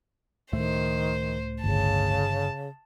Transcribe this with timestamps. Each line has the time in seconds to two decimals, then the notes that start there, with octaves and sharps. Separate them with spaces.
0.53 C#2 A2 D#3 A3 C5
1.64 G1 C#3 A5